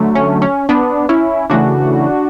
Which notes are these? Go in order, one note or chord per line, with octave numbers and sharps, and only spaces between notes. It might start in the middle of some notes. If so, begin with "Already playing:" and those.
Already playing: D3 F#3 A3
C#4
C#4
B3 D4
C#4 E4
C#3 E3 A3 D4 F#4